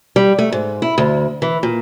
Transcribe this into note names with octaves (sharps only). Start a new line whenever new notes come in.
G3
A3
G#2
E4
D2
E3
A#2